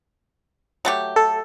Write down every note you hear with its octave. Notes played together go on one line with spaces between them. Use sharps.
F#3 A3 G4
A4